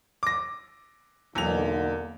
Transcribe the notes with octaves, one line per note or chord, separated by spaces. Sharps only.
D6 A#6
B1 E2 D3 A#3 F7